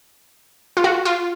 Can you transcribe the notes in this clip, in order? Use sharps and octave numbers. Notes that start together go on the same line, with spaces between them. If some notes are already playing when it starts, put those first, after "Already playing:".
F4
F#4
F4